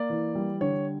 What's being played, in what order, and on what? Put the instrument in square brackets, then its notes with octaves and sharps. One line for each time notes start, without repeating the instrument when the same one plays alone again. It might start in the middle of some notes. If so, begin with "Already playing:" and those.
Already playing: [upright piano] A#3 [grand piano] D5
[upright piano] E3
G3
[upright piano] D3 [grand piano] C#5